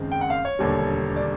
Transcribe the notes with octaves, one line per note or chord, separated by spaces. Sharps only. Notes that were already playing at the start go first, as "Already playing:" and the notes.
Already playing: F#1 F#2 D#3 G#3 C4
G5
F#5
F5
C#5
E1 D#2 D3 G3
D5